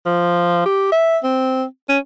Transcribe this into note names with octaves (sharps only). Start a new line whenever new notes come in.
F3
G4
E5
C4
C#4